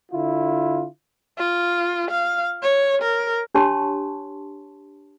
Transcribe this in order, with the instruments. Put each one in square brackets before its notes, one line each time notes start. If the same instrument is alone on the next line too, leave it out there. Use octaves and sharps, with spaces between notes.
[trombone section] D3 E4 F4
[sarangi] F4
F5
C#5
A#4
[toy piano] D4 G4 C#5 A5 C6 C#6